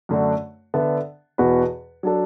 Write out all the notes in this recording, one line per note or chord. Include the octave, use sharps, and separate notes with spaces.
F#2 D3 A3 D4 F#4
D3 B3 D4 A4 E5
E2 B2 B3 F#4 B4
F#3 D4 A4